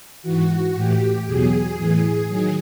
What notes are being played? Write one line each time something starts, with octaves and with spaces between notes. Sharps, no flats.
G#2 E3 F#4
A2 E3 G4
E2 B2 F#3 G#4
A2 E3
D#3 F#3 G#4